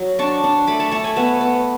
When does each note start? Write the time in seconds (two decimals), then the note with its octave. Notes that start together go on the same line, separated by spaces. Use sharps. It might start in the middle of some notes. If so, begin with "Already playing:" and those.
Already playing: F#3
0.19 D4 A5 C#6
0.44 D4
0.67 A3 B5 D6
0.79 A5 C#6
0.91 A3 A5 C#6
1.04 G#5 B5
1.16 B3 F#5 A5
1.41 B3